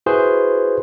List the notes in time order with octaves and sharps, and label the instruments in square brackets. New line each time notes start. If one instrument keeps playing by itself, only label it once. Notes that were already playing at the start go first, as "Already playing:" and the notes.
[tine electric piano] E4 F#4 G#4 B4 C5